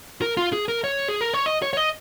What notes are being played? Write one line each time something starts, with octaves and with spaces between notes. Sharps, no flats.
A#4
F4
G#4
A#4
C#5
G#4
A#4
C#5
D#5
C#5
C#5
D#5